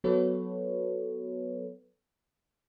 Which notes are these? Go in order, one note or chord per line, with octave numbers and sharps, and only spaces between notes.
F#3 B3 F#4 A4 B4 C#5